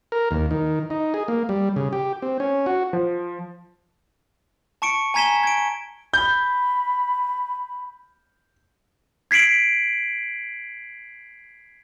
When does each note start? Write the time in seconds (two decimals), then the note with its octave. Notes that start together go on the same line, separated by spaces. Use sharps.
0.12 A#4
0.31 D#2
0.51 D#3
0.90 D#4
1.14 G#4
1.28 A#3
1.49 G3
1.76 C#3
1.93 G4
2.22 C4
2.40 C#4
2.66 F#4
2.93 F3
4.82 A5 C#6 C#7 D7
5.14 G#5 A#5 G#6 B6 E7 G7
5.43 G#6 D7
6.14 B5 G6
9.31 G#6 B6 C7 D7 F#7